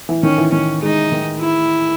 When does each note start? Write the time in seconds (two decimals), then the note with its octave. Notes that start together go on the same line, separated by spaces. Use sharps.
0.09 E3
0.23 D#3 C#4
0.38 E3
0.52 D#3 C#4
0.82 G#3 D#4
1.12 D#3
1.40 E4